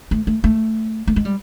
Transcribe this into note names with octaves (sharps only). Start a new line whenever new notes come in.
A3
A3
A3
A3
G#3
G3